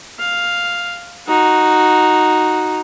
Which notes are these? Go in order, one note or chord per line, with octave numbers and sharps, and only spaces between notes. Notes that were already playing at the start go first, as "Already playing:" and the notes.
F5
D#4 F#4